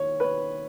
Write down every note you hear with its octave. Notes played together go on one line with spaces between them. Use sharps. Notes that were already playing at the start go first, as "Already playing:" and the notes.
Already playing: D#2 C#5
B4
C#5